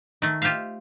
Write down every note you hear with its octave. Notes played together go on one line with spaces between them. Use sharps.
D#3 A3
F4 G4 C5 E5 F5